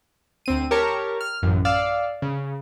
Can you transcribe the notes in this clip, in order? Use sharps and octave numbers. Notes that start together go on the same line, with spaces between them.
D2 C4 D#7
G4 A#4 C#5 A5 A#5 C#6
F6
A1 F#2
D5 F5 E6 F6
C#3